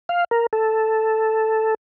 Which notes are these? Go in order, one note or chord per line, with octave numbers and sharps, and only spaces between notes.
F5
A#4
A4